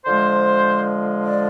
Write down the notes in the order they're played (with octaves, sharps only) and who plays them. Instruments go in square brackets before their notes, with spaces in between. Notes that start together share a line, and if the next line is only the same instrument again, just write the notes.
[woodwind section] D3 F3 G#3 C5
D5